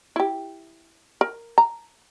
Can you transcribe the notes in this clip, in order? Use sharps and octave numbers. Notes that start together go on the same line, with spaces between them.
E4 G4
A#4
A#5